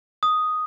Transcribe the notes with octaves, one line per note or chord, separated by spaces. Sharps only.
D#6